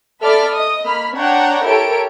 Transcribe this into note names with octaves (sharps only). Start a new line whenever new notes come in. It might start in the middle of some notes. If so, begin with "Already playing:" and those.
A4 D5 E5 B5 D6 F6
D#5 D#6
A#3 B5 F6
D4 C#5 F#5 G5 A#5
E4 G4 A4 A#4 C#5 D7